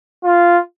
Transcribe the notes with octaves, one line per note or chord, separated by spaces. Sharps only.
F4